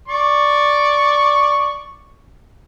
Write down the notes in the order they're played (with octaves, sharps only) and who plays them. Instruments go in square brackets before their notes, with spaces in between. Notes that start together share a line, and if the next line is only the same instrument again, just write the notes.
[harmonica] D5 C#6